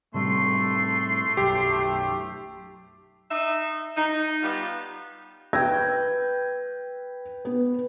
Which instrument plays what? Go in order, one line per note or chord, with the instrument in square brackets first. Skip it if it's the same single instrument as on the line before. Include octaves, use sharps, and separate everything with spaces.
[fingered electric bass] A2 C3 G3 [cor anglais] A3 [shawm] C6
[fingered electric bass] B1 F#2 [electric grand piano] G4
[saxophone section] D#4 E5
D#4
G3 B3 F4
[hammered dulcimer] B4 G5 [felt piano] E6 G#6 A#6
[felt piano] B3